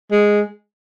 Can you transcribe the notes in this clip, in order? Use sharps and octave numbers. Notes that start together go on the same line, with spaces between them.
G#3